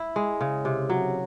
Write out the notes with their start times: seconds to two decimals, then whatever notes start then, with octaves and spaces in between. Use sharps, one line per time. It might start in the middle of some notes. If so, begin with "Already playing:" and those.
Already playing: E4
0.16 G#3
0.41 C#3
0.65 C3
0.90 F#3